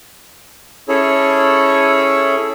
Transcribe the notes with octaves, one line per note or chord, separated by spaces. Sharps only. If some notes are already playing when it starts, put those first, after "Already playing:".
C#4 E4 G#4 A4 C#5